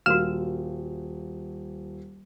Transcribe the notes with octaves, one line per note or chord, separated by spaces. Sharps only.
D#1 F#4 A#4 F5 F6 E7